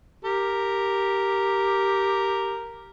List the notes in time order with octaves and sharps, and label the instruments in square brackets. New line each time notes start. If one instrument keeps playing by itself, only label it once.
[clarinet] G4 [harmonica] A#4